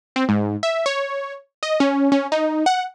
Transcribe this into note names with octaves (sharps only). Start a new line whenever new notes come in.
C4
G#2
E5
C#5
D#5
C#4
C#4
D#4
F#5